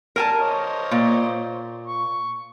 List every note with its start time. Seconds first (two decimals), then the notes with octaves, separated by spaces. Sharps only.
0.16 A#4 G#5 A5
0.40 C5 C#5 D#5
0.91 A#2
1.86 C#6